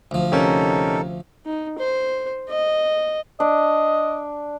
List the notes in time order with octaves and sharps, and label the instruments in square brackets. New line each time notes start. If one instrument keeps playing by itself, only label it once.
[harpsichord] D2 F3
[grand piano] C3 C#4 A#4 [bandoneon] D#4 A4
[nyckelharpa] D#4
C5
D#5
[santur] D4 [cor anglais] D#5